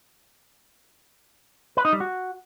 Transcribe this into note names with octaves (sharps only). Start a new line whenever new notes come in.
B4
D#4
G3
F#4